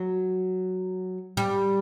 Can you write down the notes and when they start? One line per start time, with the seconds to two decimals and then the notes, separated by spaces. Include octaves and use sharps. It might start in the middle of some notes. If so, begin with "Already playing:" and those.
Already playing: F#3
1.37 G3